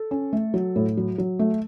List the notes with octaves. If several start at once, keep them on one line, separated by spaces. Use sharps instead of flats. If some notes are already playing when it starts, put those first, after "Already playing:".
Already playing: A4
C#4
A3
F#3
A2
F#3
F#3
A3